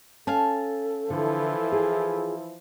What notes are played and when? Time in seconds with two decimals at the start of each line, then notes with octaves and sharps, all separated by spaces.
0.27 C#4 A4 F5 G#5 A5
1.10 D3 E3 F3 E4
1.72 F4 G#4